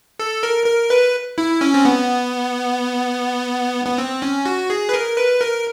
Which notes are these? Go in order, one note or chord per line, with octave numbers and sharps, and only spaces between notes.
A4
A#4
A#4
B4
E4
C#4
C4
B3
B3
C4
C#4
F#4
G#4
B4
A#4
B4
A#4